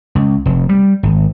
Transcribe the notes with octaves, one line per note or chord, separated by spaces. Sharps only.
C#2
F1
G3
G#1